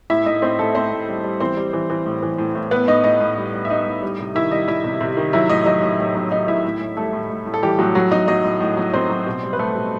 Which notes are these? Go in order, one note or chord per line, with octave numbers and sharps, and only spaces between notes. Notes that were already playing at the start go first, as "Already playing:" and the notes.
A2 E4 E5
A2 D#4 D#5
A2 C4 C5
A2 A3 A4
A2 C4 C5
A2
G3
G3
E3 C4 C5
G3
E3
E3
A2
E3
A2
A2
A2 B3 B4
A2 D#4 D#5
A2 D#4 D#5
A2
G3
G3
E5
G3 D#4 D#5
A2
G3
C3
D#3 E4 E5
G3 D#4 D#5
G3 E4 E5
C3
C3
D#3
F#3 E4 E5
A2 D#4 D#5
F#3 D#4 D#5
A2
A2
F#3
F#3 D#4 D#5
A2 E4 E5
A2
A2
G3 A3 A4
A2
A2
A2
A4
E3 G3 G4
A2 F#3 F#4
A2 F#3 F#4
F#3 D#4 D#5
F#3 D#4 D#5
A2
A2
F#3
F#3 C4 C5
F#3
B2
G3
B4
G3 A3 A4
B2